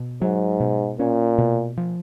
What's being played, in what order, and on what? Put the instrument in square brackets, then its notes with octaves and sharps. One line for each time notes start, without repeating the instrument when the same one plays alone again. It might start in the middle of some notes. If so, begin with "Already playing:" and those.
Already playing: [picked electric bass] B2
[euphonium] G#2 [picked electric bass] F#3
[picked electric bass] B2
[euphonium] A#2 [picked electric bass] C#4
[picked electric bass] B2
F3